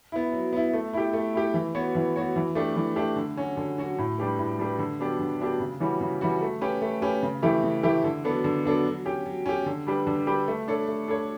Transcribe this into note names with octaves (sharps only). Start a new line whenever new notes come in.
B3 E4
F#3
B3 E4
A3
E4 G4
A3
E4 G4
E3
B3 F#4 C#5
E3
B3 F#4 C#5
E3
A3 D4 G4
E3
A3 D4 G4
D3
F#3 C#4 F#4
D3
F#3 C#4 F#4
A2
G3 D4 G4 B4
A2
G3 D4 G4 B4
D3
F#3 B3 D4 G4
D3
F#3 B3 D4 G4
C#3
E3 G3 C#4 F#4
C#3
E3 G3 C#4 F#4
A3
C#4 G4 B4
A3
C#4 G4 B4
C#3
E3 A3 E4 G4
C#3
E3 A3 E4 G4
D3
F#3 B3 D4 A4
D3
F#3 B3 D4 A4
F#3
C#4 G4
F#3
C#4 G4
D3
G3 D4 G4 B4
D3
G3 D4 G4 B4
A3
D4 A4 C#5
A3
D4 A4 C#5